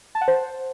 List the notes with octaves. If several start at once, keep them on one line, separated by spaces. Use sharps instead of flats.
A5
F#5
C5